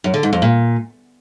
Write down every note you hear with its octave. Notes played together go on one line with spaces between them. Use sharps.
F#2
D3
G#2
F2
A#2